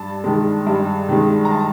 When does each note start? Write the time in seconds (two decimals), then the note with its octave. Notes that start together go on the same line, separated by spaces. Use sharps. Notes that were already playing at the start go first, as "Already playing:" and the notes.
Already playing: G2 A5
0.24 D#3 G#3
0.67 G2
1.09 D#3 G#3
1.45 A#5
1.51 A5